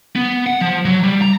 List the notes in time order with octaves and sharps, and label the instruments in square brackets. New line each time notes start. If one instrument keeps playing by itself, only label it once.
[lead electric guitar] B3
F#5
F3
F#3
G3
A#5